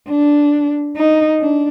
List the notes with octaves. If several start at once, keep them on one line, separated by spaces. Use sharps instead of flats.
D4
D#4
D4